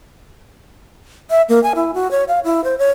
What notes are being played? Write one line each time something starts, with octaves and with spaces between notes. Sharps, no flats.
E5
A#3
G#5
E4
F#4
C#5
F5
E4
C5
C#5